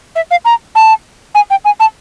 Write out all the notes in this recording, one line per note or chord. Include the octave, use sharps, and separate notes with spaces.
E5
F5
A#5
A5
G#5
G5
G#5
A5